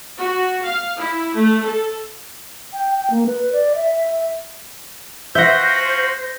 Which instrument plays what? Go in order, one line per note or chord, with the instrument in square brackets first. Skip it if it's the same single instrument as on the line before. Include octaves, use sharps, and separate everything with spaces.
[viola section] F#4
F5
E4
A3
A4
[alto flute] G5
G5
A#3
B4
D5
E5
[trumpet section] C#4 F4 F#4 [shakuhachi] C5 [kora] E5 F#5 [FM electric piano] G6 A#6